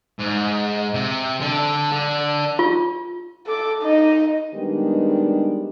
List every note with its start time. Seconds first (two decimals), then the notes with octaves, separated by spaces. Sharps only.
0.19 G#2
0.94 C3
1.40 D3 A4
1.92 D3
2.59 F4
3.47 A4 D6
3.82 D#4 D#5
4.55 D#3 G3 G#3 B3 D4 G4